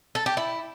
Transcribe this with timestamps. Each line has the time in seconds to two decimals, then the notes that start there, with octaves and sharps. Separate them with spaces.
0.15 A4
0.26 G4
0.37 E4